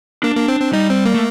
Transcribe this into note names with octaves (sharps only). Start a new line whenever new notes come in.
A#3 D4
A#3
C4
C4
G3 D#4
C4
A#3
A3